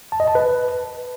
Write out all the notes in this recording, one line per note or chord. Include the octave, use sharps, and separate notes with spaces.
A5
D#5
A5
B4